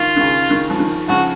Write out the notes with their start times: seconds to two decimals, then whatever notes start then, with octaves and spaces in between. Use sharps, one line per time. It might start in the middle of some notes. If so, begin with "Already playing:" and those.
Already playing: D#3 F4
0.16 D#3
0.21 C#3
0.50 D#3
0.70 F3
0.79 D#3
1.08 C#3 F3 F#4